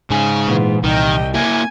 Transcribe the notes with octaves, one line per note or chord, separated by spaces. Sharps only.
G#2 C#3 G#5
A#2 E3 B3 F4
C2 D#3 D#5 G5
A#3 E4 G#5